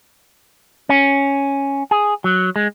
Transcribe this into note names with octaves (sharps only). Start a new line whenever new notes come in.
C#4
G#4
F#3
G#3